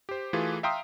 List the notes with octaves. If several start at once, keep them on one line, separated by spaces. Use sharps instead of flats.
G4 C5
E3 A3 F4 G4 G#4 B4
E5 F5 G5 A#5 C6 D#6